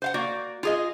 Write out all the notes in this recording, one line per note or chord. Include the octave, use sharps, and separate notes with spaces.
C5 F5 F#5
A#3 F#4 D5
F4 G#4 D#5